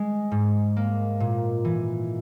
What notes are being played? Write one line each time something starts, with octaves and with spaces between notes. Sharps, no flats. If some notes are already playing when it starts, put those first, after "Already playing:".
Already playing: G#3
G#2
A#3
A#2
E3